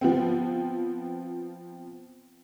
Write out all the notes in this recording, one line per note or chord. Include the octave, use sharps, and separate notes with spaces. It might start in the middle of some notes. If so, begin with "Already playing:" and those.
F3 B3 C4